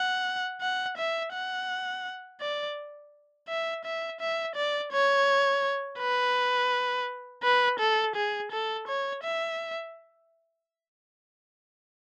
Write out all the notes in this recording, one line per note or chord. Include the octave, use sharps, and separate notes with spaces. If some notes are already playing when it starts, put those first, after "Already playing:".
Already playing: F#5
F#5
E5
F#5
D5
E5
E5
E5
D5
C#5
B4
B4
A4
G#4
A4
C#5
E5